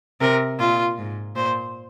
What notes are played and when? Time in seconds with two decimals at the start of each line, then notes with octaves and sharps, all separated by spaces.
0.21 C3 A#4
0.59 A#2 F4
0.98 G#2
1.36 A#2 C5